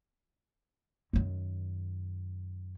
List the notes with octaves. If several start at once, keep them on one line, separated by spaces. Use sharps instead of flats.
F#2 D#3